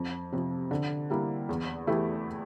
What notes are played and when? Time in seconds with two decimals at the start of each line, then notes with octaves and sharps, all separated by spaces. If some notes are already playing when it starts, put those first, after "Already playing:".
Already playing: F2
0.32 C3 F3
0.71 D3
1.10 G3 A#3 E4
1.49 E2
1.87 E3 A3 E4 G4